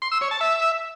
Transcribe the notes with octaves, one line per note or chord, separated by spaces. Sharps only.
C6
E6
C#5
A5
E5